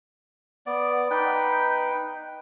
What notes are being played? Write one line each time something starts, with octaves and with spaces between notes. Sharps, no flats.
B3 D5
D#4 B4 G5